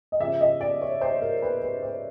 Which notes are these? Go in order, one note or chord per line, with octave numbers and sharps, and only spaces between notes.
D#5
C#3 F3 E5
D#5
D5
C#5
C5
A#4
B4
B4
C5